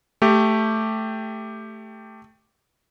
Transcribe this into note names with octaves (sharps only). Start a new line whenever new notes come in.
A3 G4